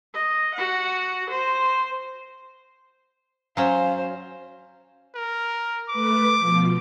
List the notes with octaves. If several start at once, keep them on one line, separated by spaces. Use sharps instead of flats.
D#5
F#4 F#5
C5
F#3 C#4 C5 F5
A#4
A3 B4 D6
B2 F3